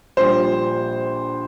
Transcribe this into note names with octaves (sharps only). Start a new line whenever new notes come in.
A#1 A#2 G3 C5